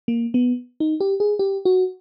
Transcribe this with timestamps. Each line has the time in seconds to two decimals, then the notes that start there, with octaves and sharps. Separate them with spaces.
0.08 A#3
0.34 B3
0.80 D#4
1.00 G4
1.20 G#4
1.39 G4
1.65 F#4